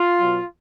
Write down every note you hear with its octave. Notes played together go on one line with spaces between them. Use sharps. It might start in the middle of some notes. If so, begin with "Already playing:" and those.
Already playing: F4
B2 F#3